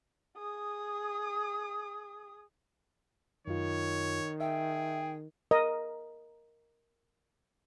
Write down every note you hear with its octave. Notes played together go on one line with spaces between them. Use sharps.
G#4 D#6
F#2 D#3 F4 C#5
G#4 E5 G5
A#4 D#5